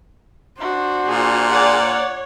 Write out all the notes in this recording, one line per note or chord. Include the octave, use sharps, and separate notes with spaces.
D4 F#4 C5
A#2 G#4
G#4 D5 F#5
C#5